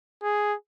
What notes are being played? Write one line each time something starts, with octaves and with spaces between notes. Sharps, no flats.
G#4